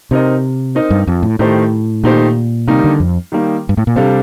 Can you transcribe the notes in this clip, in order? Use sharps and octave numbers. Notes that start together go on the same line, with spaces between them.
C3 C4 D#4 A#4 D#5
C4 D#4 A#4 D#5
G2
F2
A2
A2 D#3 A3 D#4 G4 C5
A#2 D#3 A3 D#4 G4 C5
C3 D#3 G3 A#3 D#4
D3
F2
D#3 G3 A#3 D#4
G2
A2
A#2
C3 G3 D4 A4 C5 F5